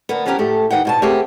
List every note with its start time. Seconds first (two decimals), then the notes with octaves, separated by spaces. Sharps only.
0.09 D2 A#3 B3
0.26 F3 B3 C#4 G4 A#4
0.38 A2 A3 G4
0.70 D#3 B3 F#5 G5
0.85 G#2 B2 A5
1.02 A3 B3 C4 G4 G#4 A#4